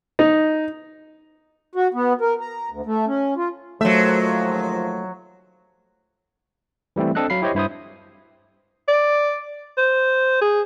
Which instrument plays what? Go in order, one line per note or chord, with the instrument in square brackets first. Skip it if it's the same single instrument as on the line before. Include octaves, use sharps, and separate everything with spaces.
[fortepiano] D#4
[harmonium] F#4
B3
A#4
A#5
D2
A3
C#4
F4
[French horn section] D#2 F3 [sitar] F#3 E5 [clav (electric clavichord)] A3
[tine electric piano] E3 G3 A3 C4 E4
C4 D4 A4 D#5 F#6
F#3 F5 B5 C7
E4 G4 C5 C#5 D#5
G2 E4 C5 D#6
[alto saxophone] D5
C5
G#4